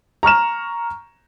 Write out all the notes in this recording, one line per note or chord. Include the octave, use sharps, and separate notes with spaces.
A#5 C#6 F6 E7